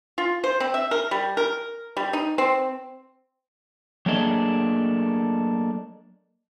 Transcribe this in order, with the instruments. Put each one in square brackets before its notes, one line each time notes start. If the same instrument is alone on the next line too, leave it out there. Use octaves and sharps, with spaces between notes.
[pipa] F4
C5
C4
E5
A#4
G3
A#4
G3
D#4
C4
[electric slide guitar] F#3 A3 A#3 D4 G#4 D#5